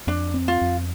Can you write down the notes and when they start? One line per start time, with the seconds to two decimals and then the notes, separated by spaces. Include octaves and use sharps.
0.07 F2 D4
0.34 C4
0.48 F4
0.61 F2